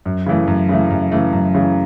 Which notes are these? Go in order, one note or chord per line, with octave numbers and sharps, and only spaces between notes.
F#2
C#3 E3 A3
F#2
C#3 E3 A3
F#2
C#3 E3 A3
F#2
C#3 E3 A3